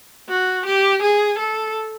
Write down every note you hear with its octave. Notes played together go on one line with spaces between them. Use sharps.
F#4
G4
G#4
A4